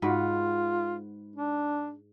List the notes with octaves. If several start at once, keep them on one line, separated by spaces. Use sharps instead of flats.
G#2 F4 F#4 B4
D4